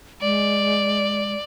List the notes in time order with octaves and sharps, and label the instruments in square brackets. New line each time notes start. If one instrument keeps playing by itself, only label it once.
[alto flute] G#3 [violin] D5